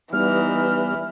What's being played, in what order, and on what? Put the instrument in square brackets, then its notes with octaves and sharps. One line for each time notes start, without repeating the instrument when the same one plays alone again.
[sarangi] E3 [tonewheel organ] G3 B3 [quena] D#4 [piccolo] F6